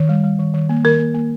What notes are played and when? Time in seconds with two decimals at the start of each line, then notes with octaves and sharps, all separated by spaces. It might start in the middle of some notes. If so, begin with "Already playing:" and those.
Already playing: D#3
0.09 G3
0.24 G3
0.39 D#3
0.54 D#3
0.69 A#3
0.84 D#3 A#4
1.00 A#3
1.14 A#3